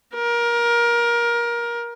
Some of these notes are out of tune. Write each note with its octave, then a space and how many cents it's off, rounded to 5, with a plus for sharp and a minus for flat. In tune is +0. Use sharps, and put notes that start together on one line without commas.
A#4 +20